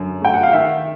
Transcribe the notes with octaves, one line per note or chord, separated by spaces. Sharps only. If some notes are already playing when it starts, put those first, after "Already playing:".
Already playing: F#2 D3
A3 G5
F#5
F5
D#3 E5